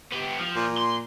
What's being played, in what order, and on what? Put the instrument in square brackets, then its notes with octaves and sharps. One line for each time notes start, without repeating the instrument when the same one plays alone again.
[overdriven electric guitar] B3 G4
F3
[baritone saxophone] A#2
[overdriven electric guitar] C6